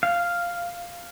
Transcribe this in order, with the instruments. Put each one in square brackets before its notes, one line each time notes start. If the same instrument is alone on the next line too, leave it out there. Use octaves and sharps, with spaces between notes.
[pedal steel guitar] F5